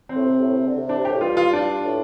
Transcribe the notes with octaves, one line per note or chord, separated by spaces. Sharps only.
C4
A2
C3
A2
C3
D3
C3
D4
C3
G4
A2
G2 F4
F4
D4
A2